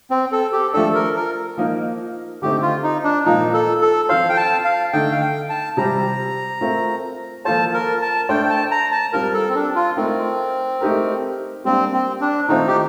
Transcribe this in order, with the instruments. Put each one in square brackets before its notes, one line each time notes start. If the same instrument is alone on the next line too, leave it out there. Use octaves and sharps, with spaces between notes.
[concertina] C4
A4
G4
[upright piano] F3 A3 D4 [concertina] A4
[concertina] A#4
A#4
[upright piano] F3 A#3 D#4 A#4
[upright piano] D3 A3 C4 D#4 [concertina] G4
[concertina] F4
D#4
D4
[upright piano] A#2 F3 A#3 [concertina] D#4
[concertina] A4
A4
[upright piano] F3 C4 F4 A4 C5 [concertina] F5
[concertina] G5
A5
F5
[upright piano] D3 A3 D#4 A4 [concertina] G5
[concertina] F5
G5
A5
[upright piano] C3 G3 C4 G4 [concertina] A#5
[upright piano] A3 C4 F4 A#4
[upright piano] F3 A#3 F4 A4 C5 [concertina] A5
[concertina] A#4
A5
[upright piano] A3 D4 A4 C5 [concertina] G5
[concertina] G5
A5
A#5
A5
[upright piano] G3 C4 F4 [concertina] A#4
[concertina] A4
C4
D4
F4
[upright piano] A3 D#4 A#4 [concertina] C4
[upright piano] A3 D#4 G4 A#4
[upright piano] G3 A#3 D4 [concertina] C4
[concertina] C4
D4
[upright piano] D#3 A3 C4 F4 [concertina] D#4
[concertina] G4